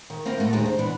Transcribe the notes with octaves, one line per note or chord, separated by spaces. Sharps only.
D#3
A#3 C4 E4 F4 A#4
A2 A3 A#3 F#4
D#2 A#2 D3 D#3 G#3 G4
C5
B2 E3 B3 D4